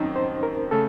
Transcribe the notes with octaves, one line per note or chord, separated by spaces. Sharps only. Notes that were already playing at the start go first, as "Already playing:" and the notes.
Already playing: D#2 D#3 F#3 C4 C#4 D#4
C5
A#4
C#3 A3 A4